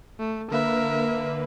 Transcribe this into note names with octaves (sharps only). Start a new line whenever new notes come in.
A3
D3 A#3 A#4 B4 E5